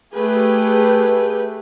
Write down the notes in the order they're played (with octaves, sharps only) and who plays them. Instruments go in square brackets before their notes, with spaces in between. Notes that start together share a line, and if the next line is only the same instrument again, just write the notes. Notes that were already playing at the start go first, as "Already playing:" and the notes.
[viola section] A3 G4 G#4 B4